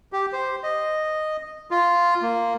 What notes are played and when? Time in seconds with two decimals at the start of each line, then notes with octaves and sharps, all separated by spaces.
0.13 G4
0.33 C5
0.63 D#5
1.71 F4
2.22 A#3